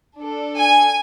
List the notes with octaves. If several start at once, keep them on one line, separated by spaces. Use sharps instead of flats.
D4
A4
G#5